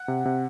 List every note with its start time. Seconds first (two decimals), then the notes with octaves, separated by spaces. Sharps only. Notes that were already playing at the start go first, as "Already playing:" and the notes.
Already playing: F#5
0.08 C3
0.25 C3